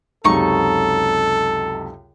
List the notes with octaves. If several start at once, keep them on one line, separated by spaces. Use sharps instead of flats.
C#2 F#2 C3 D#4 A4 C#6